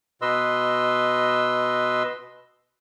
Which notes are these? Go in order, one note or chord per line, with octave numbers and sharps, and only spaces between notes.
B2 B4 D#5 C6 E6